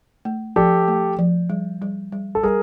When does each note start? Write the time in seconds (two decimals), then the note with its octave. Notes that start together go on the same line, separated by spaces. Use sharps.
0.25 A3
0.56 F3 G4 A4
0.88 A3
1.19 F3
1.50 G3
1.82 G3
2.12 G3
2.35 A4
2.43 G3 G#4 A#4